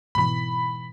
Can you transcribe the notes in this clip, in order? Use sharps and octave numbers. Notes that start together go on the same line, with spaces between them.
G#2 B2 E3 B5